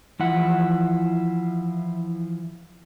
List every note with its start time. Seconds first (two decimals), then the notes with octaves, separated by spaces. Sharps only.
0.19 E3 F3 E4 F#5